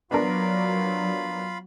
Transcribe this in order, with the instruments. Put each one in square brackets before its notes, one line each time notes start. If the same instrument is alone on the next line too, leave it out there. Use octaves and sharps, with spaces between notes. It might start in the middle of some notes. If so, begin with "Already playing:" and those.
[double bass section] F#3 [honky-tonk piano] B3 D4 A#4 [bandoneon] F4 F5 B5